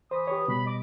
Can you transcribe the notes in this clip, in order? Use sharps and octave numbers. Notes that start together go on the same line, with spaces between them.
E3 C5 B5 D#6
G4 B4 C#5
B2 G3 B5
D#5 D6